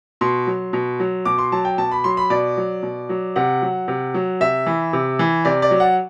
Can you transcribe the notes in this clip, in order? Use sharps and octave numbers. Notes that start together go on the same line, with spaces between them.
B2 C6
F#3
B2
F#3
B2 D6
C6
F#3 A5
G5
B2 A5
B5
F#3 C6
B5
B2 D5
F#3
B2
F#3
C3 F#5
F#3
C3
F#3
C3 E5
E3
C3
E3
C3 D5
D5
F#3
F#5